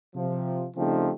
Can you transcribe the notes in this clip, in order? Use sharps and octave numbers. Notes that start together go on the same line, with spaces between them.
C3 F3
C#3 F3 G3 A3 C4 D#4